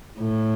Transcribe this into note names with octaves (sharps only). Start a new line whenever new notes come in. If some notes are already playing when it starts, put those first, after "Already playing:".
A2